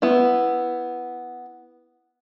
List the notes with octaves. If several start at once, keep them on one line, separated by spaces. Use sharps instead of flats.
B3 E4